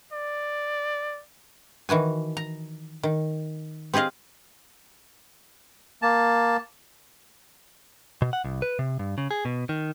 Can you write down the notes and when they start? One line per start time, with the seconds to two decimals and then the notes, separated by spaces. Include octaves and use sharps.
0.13 D5
1.89 D#3 E3 F#4 G#5
2.37 A#5
3.03 D#3
3.94 C4 G4 G#4 D#5 F5
6.02 A#3 A5
8.22 B2
8.33 F#5
8.44 C2
8.62 B4
8.79 C3
8.99 G2
9.18 C#3
9.31 G#4
9.45 B2
9.69 D#3